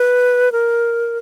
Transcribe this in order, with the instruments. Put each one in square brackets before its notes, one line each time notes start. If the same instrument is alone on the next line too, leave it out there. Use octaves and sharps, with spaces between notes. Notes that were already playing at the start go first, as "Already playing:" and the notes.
Already playing: [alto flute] B4
A#4